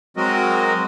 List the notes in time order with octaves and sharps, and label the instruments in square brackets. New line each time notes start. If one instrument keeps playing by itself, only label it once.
[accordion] F#3 G#3 C4 F#4 A#4 D#5